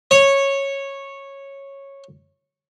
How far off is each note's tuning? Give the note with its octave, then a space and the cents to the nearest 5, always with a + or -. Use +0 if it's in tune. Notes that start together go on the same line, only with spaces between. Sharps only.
C#5 -10